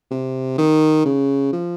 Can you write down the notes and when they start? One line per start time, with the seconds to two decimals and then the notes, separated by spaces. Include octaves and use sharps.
0.11 C3
0.58 D#3
1.05 C#3
1.52 F3